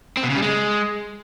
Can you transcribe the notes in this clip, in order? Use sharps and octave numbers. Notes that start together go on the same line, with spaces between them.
C4
B2
C#3
G3
G#3